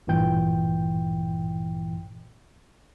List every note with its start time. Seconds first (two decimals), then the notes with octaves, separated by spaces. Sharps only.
0.07 A1 G2 A#2 E3 G5 G6